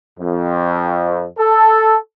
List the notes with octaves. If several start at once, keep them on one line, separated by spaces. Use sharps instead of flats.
F2
A4